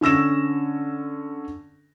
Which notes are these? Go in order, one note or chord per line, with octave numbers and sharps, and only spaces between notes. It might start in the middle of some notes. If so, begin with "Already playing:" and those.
D3 C#4 E6 A#6 E7